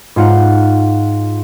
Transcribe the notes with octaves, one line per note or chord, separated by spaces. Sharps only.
G#2 F4 F#5